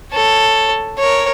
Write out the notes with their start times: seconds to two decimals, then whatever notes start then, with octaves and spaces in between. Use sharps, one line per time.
0.12 A4 C#5
0.99 A#4 C#5